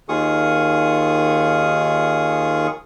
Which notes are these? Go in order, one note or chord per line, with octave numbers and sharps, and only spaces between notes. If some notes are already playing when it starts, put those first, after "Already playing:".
D#2 D#3 F4 G#4 C#6 D#6